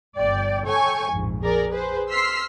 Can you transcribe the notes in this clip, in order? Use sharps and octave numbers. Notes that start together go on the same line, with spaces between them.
G1 D5 G5
A4 C#5 G5 G#5 C#6
A#1 F2 G#2
G#4 A#4 D5
G#4 B4 C5
C6 E6 F6 B6 C7